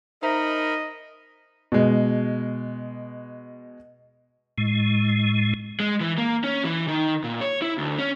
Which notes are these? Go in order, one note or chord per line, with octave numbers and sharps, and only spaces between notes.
D#4 A#4 C5 D#5 E5 A#5 B5
B2 G#3
A2 G#3
G#3
E3
A#3
C#4
E3
D#3
A#2
C#5
E4
D2
C#4